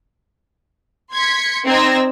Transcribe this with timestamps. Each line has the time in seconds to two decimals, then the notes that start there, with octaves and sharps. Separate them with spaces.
1.12 C6 G#6 B6 C#7
1.66 C4 D#4 D5 E6 G#6 A#6